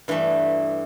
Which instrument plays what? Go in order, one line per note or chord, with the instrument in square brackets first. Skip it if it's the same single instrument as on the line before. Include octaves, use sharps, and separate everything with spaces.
[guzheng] G2 E3 A3